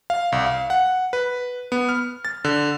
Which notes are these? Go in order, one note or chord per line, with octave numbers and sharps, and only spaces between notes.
F5
C2
F5
F#5
B4
B3
F6
A6
D3